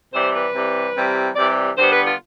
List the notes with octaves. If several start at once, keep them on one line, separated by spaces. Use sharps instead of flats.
C3 E3 G3 C5
B4
C3 E3 G3
C3 E3 G3
C3 E3 G3 D5
D3 G3 B3 C5
B4
F4